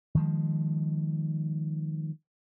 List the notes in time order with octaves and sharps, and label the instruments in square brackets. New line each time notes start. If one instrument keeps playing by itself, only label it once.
[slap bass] D#3 F3 G#3